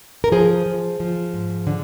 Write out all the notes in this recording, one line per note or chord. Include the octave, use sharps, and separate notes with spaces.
A#4
F3 G#4 C5
F3
F3
G#2
D3